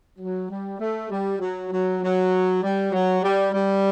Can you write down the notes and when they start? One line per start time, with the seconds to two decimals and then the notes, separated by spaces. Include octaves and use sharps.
0.19 F#3
0.49 G3
0.79 A3
1.09 G3
1.40 F#3
1.71 F#3
2.01 F#3
2.62 G3
2.92 F#3
3.22 G3
3.52 G3